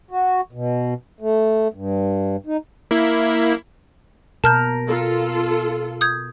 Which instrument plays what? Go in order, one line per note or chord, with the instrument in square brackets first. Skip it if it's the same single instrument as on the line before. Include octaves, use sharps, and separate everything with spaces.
[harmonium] F#4
B2
A3
G2
D#4
[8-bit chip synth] A#3 E4
[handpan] B2 A#4 [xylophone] A5 F6 G6
[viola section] F4 A4
[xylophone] D#6 G6 G#6